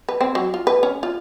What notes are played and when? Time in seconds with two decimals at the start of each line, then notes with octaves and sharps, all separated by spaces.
0.09 B4
0.21 C4
0.35 F#3
0.54 F4
0.67 B4
0.83 C#4
1.03 F4